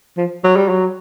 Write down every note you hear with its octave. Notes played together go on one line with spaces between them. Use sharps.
F3
F#3
G3
F#3